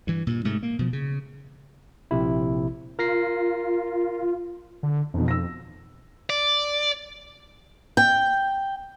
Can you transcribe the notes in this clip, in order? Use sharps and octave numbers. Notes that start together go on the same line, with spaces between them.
G2 E3
G2 A#2
G#2 C3 A3
A#3
B2 F3
C#3
A#1 C3 E4
F4 A#4 A#6 C7
D3
E1 F2 B2
E6 A#6
D5
G5